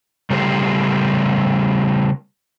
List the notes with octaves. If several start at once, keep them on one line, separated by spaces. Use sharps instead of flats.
C#3 G3 A3 G4 C5